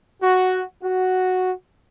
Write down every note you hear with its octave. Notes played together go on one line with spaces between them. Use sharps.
F#4
F#4